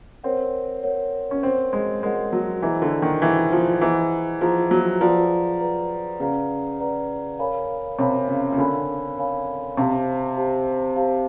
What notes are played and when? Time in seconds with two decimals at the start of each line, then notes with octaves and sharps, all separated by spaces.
0.24 C4 A#4 C#5 F#5
0.83 A#4 C#5 F#5
1.31 C#4
1.43 C4 A#4 C#5 F#5
1.73 G#3
2.03 G#3 A#4 C#5 F#5
2.33 F#3
2.62 E3 G#4 C5 D#5 F#5 A#5
2.82 D3
3.02 D#3
3.21 E3 G#4 C5 D#5 F#5 A#5
3.52 F3
3.81 E3 G#4 C5 D#5 F#5 A#5
4.41 F3 G#4 C5 D#5 F#5 A#5
4.71 F#3
5.01 F3 G#4 B4 D5 F#5 A#5
5.60 G#4 B4 D5 F#5 A#5
6.20 C#3 G#4 B4 D5 F#5 A#5
6.80 G#4 B4 D5 F#5 A#5
7.39 A#4 C#5 F5 G#5 B5
7.99 C3 A#4 C#5 F5 G#5 B5
8.28 C#3
8.52 C#3
8.58 D3 A#4 C#5 F5 G#5 B5
9.17 A#4 C#5 F5 G#5 B5
9.77 C3 G4 C5 F5 A5
10.37 G4 C5 F5 A5
10.96 G4 C5 F5 A5